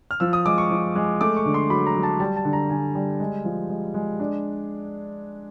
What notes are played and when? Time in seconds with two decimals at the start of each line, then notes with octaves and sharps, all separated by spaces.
0.11 F6
0.20 F3 E6
0.33 D#6
0.46 G#3 D6
0.58 C#6
0.71 F3
0.95 G#3
1.21 A3 D6
1.37 C#6
1.46 D3
1.54 C6
1.70 F#3 B5
1.86 A#5
1.95 F#3
2.03 A5
2.20 G3 A5
2.36 A5
2.45 D3
2.53 A#5
2.70 D3 G#5
2.95 G3
3.20 G#3
3.45 F3
3.70 G#3
3.94 G#3
4.20 D4